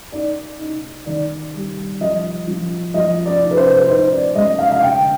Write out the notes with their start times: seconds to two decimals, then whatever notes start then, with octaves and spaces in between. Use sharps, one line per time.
0.12 D#4 D5
0.59 D#4
1.06 D#3 D5
1.54 G3
2.01 F3 D#5
2.47 F3
2.94 F3 D#5
3.26 D5
3.42 D#4
3.51 B4
3.57 C5
3.77 B4
3.88 D#4 C5
4.11 D5
4.35 G#3 D#5
4.58 F5
4.72 F5
4.82 D3 G5